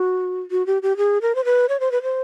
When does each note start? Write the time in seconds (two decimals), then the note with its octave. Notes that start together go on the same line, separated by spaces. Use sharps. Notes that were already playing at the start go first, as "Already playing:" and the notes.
Already playing: F#4
0.51 F#4
0.67 G4
0.83 G4
0.97 G#4
1.22 A#4
1.35 C5
1.45 B4
1.69 C#5
1.80 C5
1.92 B4
2.02 C5